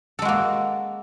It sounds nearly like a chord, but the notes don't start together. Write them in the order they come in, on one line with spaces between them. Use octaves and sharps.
A4 G#3 F#4 A#3